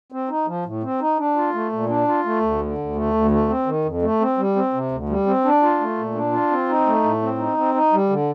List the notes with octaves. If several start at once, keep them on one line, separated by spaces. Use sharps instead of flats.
C4
D#4
F3
A2
C4
D#4
D4
F4
A3
A#2
D4
F4
A3
D2
D3
D2
A3
D2
A3
C4
D#3
F2
A3
C4
G3
C4
C3
D2
G3
C4
D4
F4
A3
A#2
D4
F4
C4
D#4
A3
A2
C4
D#4
C4
D#4
G3
D3